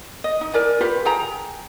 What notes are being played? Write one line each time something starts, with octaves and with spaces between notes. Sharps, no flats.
D#5
D#4
E4 A#4 D5 G#5
F4 G4 A#4 B4
G#4 G5 A#5